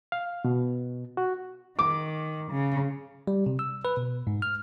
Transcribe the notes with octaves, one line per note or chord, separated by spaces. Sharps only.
F5
B2
F#4
D#3 D6
C#3
G3
C3
E6
B4
B2
G#2
F6